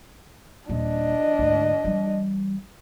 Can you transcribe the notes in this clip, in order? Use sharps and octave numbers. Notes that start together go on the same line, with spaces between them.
D#1 D4 D#5
D2 G#2
E3 G3